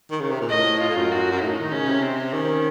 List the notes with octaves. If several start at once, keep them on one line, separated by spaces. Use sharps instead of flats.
D#3
C#3
C3
A#2
A2 D#5
F4
A2
F#2
F#4
F#2
A2 D#4
D#3
C#3 C#4
C3
C4
D#3 C#4